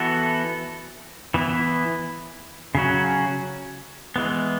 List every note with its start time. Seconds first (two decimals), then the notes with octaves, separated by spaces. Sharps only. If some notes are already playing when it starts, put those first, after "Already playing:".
Already playing: E3 B3 F#4 A4
1.34 E3 B3 E4
2.75 C#3 F#3 C#4 F#4
4.16 E3 G#3 B3